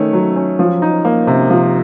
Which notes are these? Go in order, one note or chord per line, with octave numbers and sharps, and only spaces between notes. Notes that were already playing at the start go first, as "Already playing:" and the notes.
Already playing: D#3 A3 C#4
F#3
C#4
F3
D#4
A#3
C3
F3